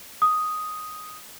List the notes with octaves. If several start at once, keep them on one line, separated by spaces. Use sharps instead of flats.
D#6